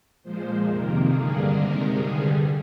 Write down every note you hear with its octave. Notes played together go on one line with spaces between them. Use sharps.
A#2 F3 G#3 C5
F2 C3 D#3 A#3 A#4
G2 D3 G3 A#3 G#4
C3 D#3 G#3 A#4
G2 D3 G3 G#4